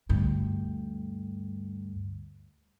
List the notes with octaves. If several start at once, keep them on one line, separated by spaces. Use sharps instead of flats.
D2 G2